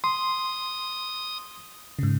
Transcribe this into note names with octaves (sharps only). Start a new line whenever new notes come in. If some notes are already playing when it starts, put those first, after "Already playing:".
C6 D#6
G#2 C#3